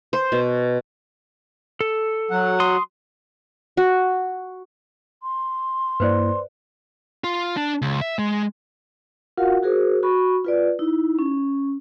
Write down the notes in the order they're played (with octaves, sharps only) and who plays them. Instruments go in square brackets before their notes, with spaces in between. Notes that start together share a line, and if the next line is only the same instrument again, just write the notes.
[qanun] C5
B2
[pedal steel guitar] A4
[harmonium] F#3 F#5
[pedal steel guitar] C6 D#6
[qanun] F#4
[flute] C6
[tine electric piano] G2 A#3 E4 [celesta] B4 C5 D5
[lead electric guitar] F4
D4
C#2
E5
G#3
[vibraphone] F4 F#4 A#4 F5 F#5
F#4 G#4 A#4 C5
F#4 B5 C#6
F4 B4 D5
D#4 E4
C#4